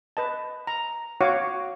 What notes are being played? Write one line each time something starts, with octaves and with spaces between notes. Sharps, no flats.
B4 D#5 A5
A#5
F#4 C#5 F5 F#5 D6